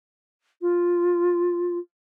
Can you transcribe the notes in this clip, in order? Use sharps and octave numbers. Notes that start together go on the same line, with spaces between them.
F4